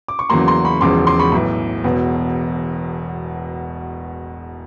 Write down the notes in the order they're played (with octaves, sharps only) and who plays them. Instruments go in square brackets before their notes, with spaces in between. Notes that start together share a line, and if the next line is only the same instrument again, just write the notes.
[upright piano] D6
C#6
E2 C#3 F#3 A#3 A#5 C6
A#5 C6
B5 C#6
E1 E2 C#3 F3 G#3 C6 D6
C6 D6
B5 C#6
B1 A2 E3
E1 E2 B2